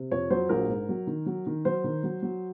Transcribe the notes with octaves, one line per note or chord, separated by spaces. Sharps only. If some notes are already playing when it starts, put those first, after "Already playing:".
Already playing: C3
F2 C#5
F#3 C5
A#1 A#4
G#2
F#3
D#3
F#3
D#3
F#3 C5
D#3
F#3
F#3